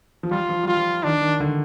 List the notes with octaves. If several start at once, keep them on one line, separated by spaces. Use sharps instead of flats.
F3
G3 F4
F3
G3 F4
F3
D#3 D4
D#3
D3